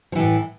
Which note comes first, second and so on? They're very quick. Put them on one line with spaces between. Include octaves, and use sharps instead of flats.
F3 E3 A2